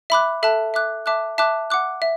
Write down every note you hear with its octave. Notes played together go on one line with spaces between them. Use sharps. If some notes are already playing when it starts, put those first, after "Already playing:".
E5 B5 D6 F#6
A4 E5 A5 F#6
E5 D6 F#6
E5 A5 D6 F#6
E5 A5 D6 F#6
F#5 D6 F#6
E5